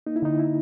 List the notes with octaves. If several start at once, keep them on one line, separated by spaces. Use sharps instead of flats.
A#3 D#4
E4
D3 D#4
E4